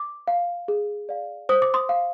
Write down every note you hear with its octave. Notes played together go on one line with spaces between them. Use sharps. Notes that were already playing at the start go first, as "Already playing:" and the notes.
Already playing: D6
F5
G#4
D5 F5
C5 D#6
D6
C6 D#6
F5